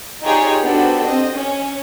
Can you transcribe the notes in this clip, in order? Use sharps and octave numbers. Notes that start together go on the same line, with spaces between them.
D#4 F4 G4 G#4 C#5 D5
B3 D4 F#4 G4 A4 C5
C4 D#5
C#4